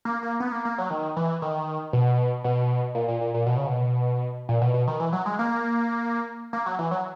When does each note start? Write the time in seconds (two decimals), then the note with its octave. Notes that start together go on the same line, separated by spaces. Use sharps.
0.05 A#3
0.23 A#3
0.40 B3
0.52 A#3
0.65 A#3
0.78 F#3
0.90 D#3
1.16 E3
1.42 D#3
1.93 B2
2.44 B2
2.95 A#2
3.08 A#2
3.21 A#2
3.34 A#2
3.46 B2
3.57 C#3
3.67 B2
4.49 A#2
4.61 B2
4.74 B2
4.87 D#3
5.00 E3
5.13 F#3
5.26 G#3
5.39 A#3
6.53 A#3
6.66 F#3
6.79 E3
6.91 F#3